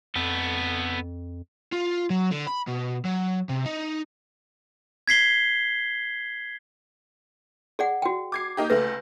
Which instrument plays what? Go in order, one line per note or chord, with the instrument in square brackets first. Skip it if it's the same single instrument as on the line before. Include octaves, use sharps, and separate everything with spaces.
[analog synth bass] F2 [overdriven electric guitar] B3 A4
[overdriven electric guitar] F4
F#3
D3
B5
B2
F#3
C3
D#4
[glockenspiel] G#6 B6 C7 G7
[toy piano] G#4 D5 F#5
F#4 G5
[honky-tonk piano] D6 G#6 C7
A#3 D#4 G4
[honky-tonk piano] C#2 A3 A#6 [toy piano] B4